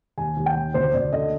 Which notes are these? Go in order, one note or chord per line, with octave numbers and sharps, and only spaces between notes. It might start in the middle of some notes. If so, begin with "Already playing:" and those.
D#2 G#5
D#2
G5
D#3
D2 C5
D2 D5
D3 D#5